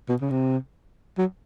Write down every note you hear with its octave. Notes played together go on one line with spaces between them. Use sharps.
B2
C#3
C3
F#3